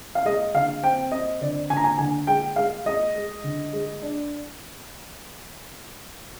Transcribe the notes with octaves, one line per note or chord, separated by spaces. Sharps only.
F5
G#3 D#5
D3 F5
C4 G5
C4 D#5
D3 D5
D3 G#5
A#5
G#5
D3 G#5
G#3 G5
G#3 F5
G#3 D#5
G#3
D3
G#3
D4